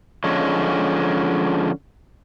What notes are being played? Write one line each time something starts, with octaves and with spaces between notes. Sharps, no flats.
D3 F3 G#3 C#4